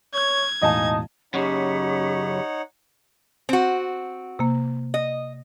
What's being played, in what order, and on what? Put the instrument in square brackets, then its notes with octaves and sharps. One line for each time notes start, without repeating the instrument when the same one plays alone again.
[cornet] C#5 [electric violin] G#6
[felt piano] E1 A2 F5 [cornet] D#4 [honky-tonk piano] D#5 G#5 A5
[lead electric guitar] F#2 C#3 [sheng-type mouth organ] D#4 C#5 F#5 [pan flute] G4
[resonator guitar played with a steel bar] C4 F#4
[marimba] C3 A#3
[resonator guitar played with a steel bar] D#5